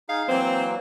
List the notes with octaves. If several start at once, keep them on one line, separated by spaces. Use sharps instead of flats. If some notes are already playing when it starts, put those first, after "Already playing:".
D#4 G#4 F5
E3 F#3 A#3 C4 C5